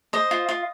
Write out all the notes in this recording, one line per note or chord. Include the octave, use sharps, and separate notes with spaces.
C5 D#5
F4
F4